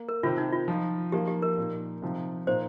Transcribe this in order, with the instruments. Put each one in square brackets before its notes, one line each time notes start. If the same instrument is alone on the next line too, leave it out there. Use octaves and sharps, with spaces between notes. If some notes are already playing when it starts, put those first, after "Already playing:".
Already playing: [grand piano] A#3
[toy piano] A#4
[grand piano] C3 D#3 C4 [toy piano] F4
[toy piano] D#4
F4
[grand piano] F3 D#4
[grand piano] F3 A#3 D#4 [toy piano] G4
[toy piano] G4
A#4
[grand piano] A#2 A#3 D#4
C3 F3 C4 D#4
[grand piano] A#2 A#3 D#4 [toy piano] C5